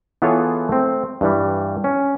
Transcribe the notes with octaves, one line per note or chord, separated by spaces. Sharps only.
E3 B3 F4 G#4 A4 C#5
A3 C4
G2 E3 G3
C#4